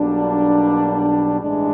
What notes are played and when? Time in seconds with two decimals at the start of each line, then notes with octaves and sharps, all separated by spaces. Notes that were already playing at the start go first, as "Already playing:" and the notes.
Already playing: B1 B2 G3 A#3 D4
1.41 A1 G2 E3 G#3 D4